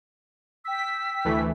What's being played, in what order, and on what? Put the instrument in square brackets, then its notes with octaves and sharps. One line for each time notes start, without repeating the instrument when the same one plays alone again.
[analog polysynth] G5 B6 [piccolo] E6
[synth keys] D2 E3 A3